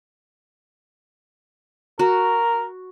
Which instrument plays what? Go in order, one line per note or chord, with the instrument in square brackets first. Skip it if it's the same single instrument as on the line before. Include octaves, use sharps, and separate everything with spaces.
[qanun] F#4 [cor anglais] A#4